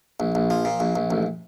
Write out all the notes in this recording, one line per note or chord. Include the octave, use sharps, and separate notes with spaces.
A#1
A#1
F3
A#2
A#1
A#1
A1